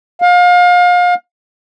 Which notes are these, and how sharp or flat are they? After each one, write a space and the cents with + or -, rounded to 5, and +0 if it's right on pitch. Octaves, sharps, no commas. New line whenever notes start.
F5 +35